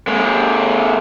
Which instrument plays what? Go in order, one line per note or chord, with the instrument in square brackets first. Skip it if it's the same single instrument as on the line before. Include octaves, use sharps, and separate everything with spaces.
[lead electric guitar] G#3 A#3